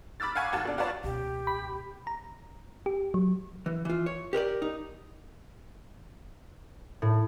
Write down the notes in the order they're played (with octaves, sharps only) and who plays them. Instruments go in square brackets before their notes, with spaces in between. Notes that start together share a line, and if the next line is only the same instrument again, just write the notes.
[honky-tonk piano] B5 D6 E6 F6 A6
F5 F#5 G#5 B5 C#6
D#2 F#4 A5
B2 D4
F4 F#4 B4 C#5 D5 A5
[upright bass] C#2 B2 [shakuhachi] G4
[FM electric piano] B5
[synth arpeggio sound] A#5
G4
F#3
[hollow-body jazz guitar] E3
E3 F4
C#5
G4 A#4 C5 D5
D#4
[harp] A2